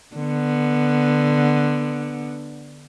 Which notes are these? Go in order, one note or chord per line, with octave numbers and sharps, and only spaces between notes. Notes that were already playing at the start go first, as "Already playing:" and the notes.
D3 B3